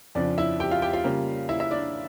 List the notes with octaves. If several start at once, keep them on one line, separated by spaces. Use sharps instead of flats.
F2 C#3 F3 D4 D5
E4 E5
G4 G5
F4 F5
G4 G5
F4 F5
C#3 G3 A#3
E4 E5
E4 E5
D4 D5